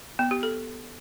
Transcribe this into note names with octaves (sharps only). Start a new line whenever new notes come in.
B3
G4
A4